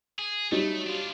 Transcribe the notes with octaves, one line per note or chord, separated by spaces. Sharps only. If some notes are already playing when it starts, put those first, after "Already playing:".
G#4
F#3 G3 A3 D#4
D4 F4